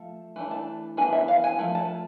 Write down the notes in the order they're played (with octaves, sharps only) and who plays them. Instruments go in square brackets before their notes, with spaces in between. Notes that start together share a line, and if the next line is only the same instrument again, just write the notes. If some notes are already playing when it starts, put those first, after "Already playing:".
Already playing: [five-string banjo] F3 A3
E3 A3 D4
A5
E3 B3 D4 G#5
E5
F5
G#5
F3 A3
A5